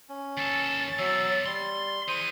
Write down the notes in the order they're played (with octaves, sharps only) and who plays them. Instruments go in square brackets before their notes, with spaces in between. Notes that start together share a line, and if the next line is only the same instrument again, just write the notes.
[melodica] C#4
[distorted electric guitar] D#2 A4 [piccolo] A6
[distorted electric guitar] E2 B2 [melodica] F#3 E6
[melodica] G3 [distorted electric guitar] C6
[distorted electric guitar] E4 G#4 [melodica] C5 [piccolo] D#7